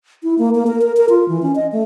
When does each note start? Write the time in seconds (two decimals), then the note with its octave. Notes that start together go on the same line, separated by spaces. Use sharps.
0.23 E4
0.38 A#3
0.55 A#3
0.67 A#4
0.81 A#4
0.97 A#4
1.09 F4
1.28 E3
1.42 C#4
1.55 D#5
1.72 A3